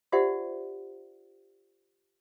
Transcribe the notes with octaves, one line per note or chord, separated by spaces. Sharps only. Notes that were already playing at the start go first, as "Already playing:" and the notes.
F4 G4 C5 D5 E5 F#5